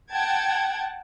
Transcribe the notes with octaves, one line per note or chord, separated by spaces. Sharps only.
F#5 G5 A5 G#6